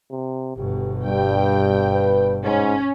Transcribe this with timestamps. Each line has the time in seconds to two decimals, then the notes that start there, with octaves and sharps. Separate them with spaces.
0.11 C3
0.57 G1 B2 G4
1.05 G2 G3 G5
1.95 B4
2.45 G#2 C#4